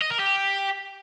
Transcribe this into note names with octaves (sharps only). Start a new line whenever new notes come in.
D#5
A#4
G4